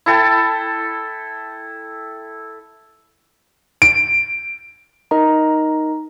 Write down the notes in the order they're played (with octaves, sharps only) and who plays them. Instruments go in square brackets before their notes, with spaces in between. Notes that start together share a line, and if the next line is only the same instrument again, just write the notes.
[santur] E4 A4 G5 A5
[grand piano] D7
[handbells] D#4 A#4 D#5 A#5